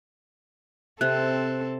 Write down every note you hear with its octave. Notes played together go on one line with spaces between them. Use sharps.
C3 C4 A4 F#6